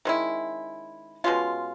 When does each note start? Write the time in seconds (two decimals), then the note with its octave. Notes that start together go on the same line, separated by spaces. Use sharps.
0.05 D#3 G#3 C#4 E4
1.24 B2 G#3 C#4 F4